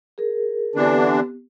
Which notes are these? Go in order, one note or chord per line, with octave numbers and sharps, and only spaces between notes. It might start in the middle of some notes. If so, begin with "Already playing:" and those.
G#4 A#4
D3 E3 B3 C4 D4 G4